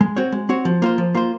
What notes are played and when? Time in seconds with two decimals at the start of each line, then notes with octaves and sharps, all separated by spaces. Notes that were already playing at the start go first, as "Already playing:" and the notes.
0.01 G#3
0.17 C4 F#4 C#5
0.32 G#3
0.49 C4 F#4 C#5
0.65 F3
0.82 A#3 F4 C5
0.98 F3
1.14 A#3 F4 C5